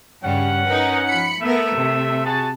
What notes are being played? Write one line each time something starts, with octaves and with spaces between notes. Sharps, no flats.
G2 C#3 G3 C#4 F#5
D#4 A#4 B4
F3 B5 C#7
A3 B3 A#4 E5
C3
F#4 G#4 A5